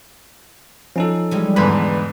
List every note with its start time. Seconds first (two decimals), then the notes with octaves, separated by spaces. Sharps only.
0.96 F3 C#4 D#4 A4
1.31 E3 G3 G#3
1.56 E2 G#2 D3 E3 F4 B4 B5